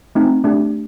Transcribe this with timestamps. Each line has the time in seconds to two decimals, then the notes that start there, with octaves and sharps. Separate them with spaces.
0.15 A3 C4 D#4
0.44 A3 D4 G4